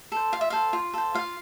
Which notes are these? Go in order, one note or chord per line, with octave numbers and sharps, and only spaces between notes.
A4 C5
F4 F5
E5
A4 C5 F5
F4
A4 C5
F4 F5